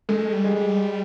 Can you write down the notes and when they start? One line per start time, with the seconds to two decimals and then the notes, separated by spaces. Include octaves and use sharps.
0.09 G#3 A3
0.32 G3
0.44 G#3
0.56 G3